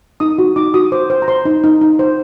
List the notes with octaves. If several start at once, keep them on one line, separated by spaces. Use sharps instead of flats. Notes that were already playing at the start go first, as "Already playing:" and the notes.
D#4 D#6
F#4
D#4 D6
F#4 D#6
C5 D6
C5
A#5
C5 C6
D#4
D#4
D#4
C5